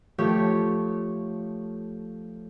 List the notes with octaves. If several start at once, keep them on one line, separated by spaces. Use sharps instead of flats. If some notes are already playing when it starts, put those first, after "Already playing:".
F3 A3 G4 C#5